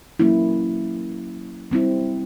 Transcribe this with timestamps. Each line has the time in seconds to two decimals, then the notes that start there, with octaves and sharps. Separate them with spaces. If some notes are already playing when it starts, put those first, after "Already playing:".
0.19 F#3 A#3 C#4 E4
1.71 G3 C4 E4